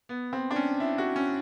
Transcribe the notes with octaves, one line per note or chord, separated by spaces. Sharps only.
B3
C4
D4
C#4
E4
F#4
C#4